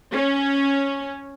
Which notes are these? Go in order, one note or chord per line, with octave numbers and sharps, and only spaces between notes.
C#4